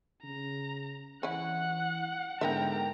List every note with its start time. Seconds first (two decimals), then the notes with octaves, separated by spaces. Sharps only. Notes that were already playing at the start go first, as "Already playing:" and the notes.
0.23 C#3 A#5
1.23 E3 C#4 E4 F#5 F#6
2.41 G#2 D3 B3 E4 A#4 E5 G5 A#5